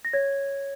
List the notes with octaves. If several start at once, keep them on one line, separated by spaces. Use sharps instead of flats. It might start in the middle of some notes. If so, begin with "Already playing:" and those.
A#6
C#5 G#6